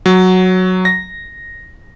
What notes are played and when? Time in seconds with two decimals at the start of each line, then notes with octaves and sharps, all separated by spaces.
0.06 F#3
0.85 A#6